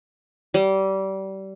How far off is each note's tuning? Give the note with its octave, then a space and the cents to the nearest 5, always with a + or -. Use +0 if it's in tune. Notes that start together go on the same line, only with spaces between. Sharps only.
G3 -25